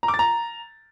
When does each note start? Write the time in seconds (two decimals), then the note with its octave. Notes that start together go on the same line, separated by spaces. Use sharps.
0.03 A#5
0.08 D6
0.14 A6
0.19 A#5